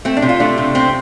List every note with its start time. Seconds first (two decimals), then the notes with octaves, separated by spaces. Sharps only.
0.05 A3 C4
0.17 D4
0.22 C3
0.29 F4
0.40 A3 D4
0.58 C3
0.75 C3 C4